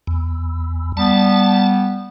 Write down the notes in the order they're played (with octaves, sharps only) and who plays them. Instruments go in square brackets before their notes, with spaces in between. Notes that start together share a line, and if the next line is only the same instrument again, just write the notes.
[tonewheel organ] E2
[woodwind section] G3 B3 [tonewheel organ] A5